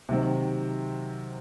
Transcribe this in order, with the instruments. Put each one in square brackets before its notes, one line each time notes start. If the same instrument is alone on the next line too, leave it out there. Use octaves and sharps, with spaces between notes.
[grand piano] C3 D#3 F#3 C4